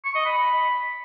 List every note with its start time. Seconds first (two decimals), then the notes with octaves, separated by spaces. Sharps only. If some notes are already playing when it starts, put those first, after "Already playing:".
0.05 C#6
0.15 D#5
0.25 B5